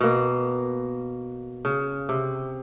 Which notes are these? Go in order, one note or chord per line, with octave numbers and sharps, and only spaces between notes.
B2 A#3
C#3
C3